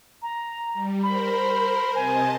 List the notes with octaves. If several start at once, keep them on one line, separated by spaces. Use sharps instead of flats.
A#5
G3
A#4 C5 B5
C3 D#5 G#5 A5